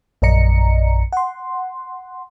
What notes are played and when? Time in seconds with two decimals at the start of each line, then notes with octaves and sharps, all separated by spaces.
0.22 A#1 F#2 D5 D#5 A#5 C#7
1.13 F#5 C6